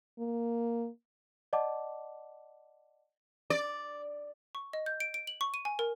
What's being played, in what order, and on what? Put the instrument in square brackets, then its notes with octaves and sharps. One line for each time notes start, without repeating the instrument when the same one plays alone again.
[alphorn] A#3
[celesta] D5 D#5 F#5 A5 D6
[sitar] D5
[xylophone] C#6
D#5
G6
D7
D7
F#7
C#6
D#7
G#5
A#4